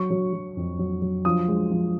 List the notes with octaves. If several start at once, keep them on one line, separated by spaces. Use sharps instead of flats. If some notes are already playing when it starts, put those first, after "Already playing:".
Already playing: F#3 C#6
F#3
F#3
F2
F#3
F#3
F3 D#6
G#3
F3